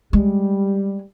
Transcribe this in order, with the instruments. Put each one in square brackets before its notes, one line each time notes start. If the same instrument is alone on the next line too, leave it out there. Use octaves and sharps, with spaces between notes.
[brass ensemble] G3 [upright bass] G#3